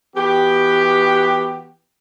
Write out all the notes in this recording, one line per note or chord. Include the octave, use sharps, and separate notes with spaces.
E3 B3 F#4 G4